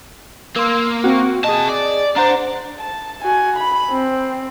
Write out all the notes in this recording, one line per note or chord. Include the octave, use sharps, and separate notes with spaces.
A#3 C6 E6
C4 F#4
C3 G#4 D#5 A5
D5
D4 C5 F#5 A#5
A5
F#4 G#5
B5
C4